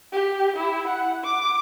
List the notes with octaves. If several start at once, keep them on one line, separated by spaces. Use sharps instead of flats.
G4
E4
F#5
D6